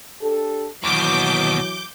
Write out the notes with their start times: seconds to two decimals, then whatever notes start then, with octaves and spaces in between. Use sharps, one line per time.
0.22 D4 G4 A4
0.84 D#2 B2 E3 F#3 D6 G6